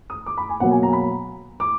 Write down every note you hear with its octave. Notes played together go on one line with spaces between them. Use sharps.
D#6
D6
B5
G#5
B2 F#3 A#3 F#5
G#5
A#5
B5
D6